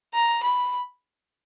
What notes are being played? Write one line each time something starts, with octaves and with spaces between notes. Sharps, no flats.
A#5
B5